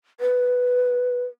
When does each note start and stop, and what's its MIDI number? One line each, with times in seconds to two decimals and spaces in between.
0.20 1.25 71